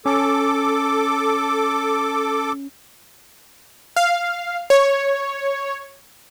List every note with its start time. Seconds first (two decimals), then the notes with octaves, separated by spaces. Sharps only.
0.06 C#4 A4 D6
3.96 F5
4.70 C#5